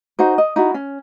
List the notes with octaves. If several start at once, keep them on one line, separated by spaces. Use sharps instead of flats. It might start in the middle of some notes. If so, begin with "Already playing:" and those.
D#4 F#4 C5
D#5
D#4 E4 F#4
C#4